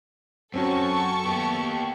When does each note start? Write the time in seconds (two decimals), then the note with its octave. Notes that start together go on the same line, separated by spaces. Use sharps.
0.54 F#2 C4 C#4 F#4 A4 A5 C#6
1.26 A#3 B3 G4